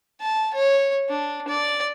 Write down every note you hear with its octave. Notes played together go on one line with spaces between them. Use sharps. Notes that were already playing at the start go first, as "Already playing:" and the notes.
A5
C#5
D4
D5